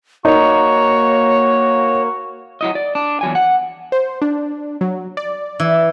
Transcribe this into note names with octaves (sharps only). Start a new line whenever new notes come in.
A#3 D#4 F#4 C#5
F#3 E4 D#5
D5
D4
E2 F#3 G#5
F#5
C5
D4
F#3
D5
E3